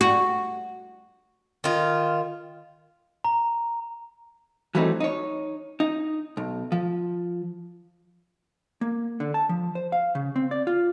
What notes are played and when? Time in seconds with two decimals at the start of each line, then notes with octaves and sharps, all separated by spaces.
0.01 F#4
1.64 D#3 F4
3.24 A#5
4.75 E3 F#3 G3 A3 C4 D#4
5.00 D#4 C#5
5.80 D#4
6.37 B1
6.72 F3
8.81 A#3
9.20 D3
9.34 A5
9.49 F3
9.75 C5
9.92 F5
10.15 C#3
10.36 C4
10.51 D5
10.67 F4